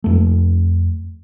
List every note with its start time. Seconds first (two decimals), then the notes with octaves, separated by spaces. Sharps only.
0.04 F2 A3